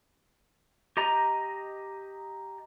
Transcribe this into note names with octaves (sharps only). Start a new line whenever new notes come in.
G4 D#5 A#5